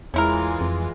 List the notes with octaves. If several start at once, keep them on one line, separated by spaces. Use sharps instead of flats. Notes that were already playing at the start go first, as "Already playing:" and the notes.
E2 E3 G#3 C#4 E4 F4 A#4
F2